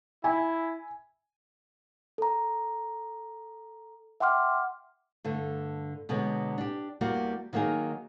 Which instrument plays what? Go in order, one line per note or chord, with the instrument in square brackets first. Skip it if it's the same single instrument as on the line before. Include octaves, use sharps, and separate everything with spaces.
[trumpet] E4 [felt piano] G#5
[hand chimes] A4 A#5
E5 F#5 G5 C6 D6 F6
[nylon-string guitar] G2 D3 A3
B2 D3 F#3 G#3 B3
D4 G4
E2 G3 A#3 F#4
D#3 F#3 A#3 D#4 G#4